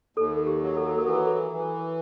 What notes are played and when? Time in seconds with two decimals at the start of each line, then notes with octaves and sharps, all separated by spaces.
0.17 D#2 A4
0.47 G4
0.62 F#3
0.77 A4
0.98 A#4
1.06 E3 A4
1.51 E3